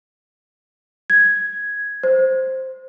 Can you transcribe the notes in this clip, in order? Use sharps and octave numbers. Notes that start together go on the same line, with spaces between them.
G#6
C5